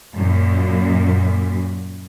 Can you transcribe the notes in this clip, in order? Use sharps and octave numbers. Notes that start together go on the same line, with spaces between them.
F#2 A#2